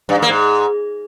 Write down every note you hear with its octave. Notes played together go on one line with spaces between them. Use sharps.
G2
G#2
A#3
G#2